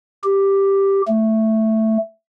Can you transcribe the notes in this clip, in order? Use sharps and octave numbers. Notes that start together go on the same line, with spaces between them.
G4
A3